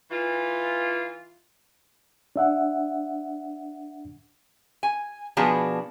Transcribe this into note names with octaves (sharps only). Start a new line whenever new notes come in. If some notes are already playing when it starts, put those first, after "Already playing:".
E3 F4
D4 E5 F#5
G#5
B2 F3 B3 D4 G#4